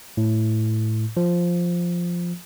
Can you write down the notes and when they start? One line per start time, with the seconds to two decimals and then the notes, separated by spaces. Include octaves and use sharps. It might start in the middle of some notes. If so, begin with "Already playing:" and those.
0.17 A2
1.17 F3